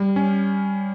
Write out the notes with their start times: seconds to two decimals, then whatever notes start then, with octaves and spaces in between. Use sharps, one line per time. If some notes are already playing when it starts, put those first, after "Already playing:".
Already playing: G3
0.16 C#4